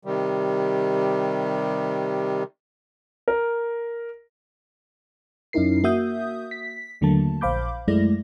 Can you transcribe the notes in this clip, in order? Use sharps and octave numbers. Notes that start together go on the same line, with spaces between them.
C3 D#3 G3
A#4
F#2 C#4 D#4 E4 A#4 C7
A#3 F#4 E5 D#6 G6
B6
D#2 D3 F#3 A3 A#3 A5
A#1 C5 F5 B5 D6 G6
F#2 G#3 A3 E4 D5 A#6